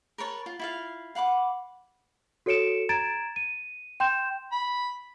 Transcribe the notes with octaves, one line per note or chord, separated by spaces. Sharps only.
A#4 B4 C#5 A5
F4
E4 F4 F5
F5 F#5 B5 D6
F#4 A4 C#5 C#7 D7 E7
A#5 G#6 A6 D7 E7
D#7
G5 C6 G6 E7
B5